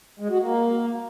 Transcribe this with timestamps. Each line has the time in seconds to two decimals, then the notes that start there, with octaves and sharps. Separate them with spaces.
0.19 G#3
0.30 F#4
0.40 A#3